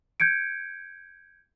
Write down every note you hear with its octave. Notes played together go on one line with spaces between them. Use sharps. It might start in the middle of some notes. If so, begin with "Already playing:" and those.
G6 G#6 C#7 D7